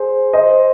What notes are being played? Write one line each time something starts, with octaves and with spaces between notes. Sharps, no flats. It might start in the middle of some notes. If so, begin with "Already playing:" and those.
Already playing: G#4 C5
C5 D#5